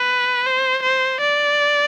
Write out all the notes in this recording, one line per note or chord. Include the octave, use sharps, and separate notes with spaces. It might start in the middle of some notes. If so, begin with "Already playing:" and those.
Already playing: B4
C5
C5
D5